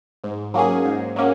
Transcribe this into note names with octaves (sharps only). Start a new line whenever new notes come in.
G#2
F#3 A#3 C#4 G#4
G#2
F#3 A#3 C#4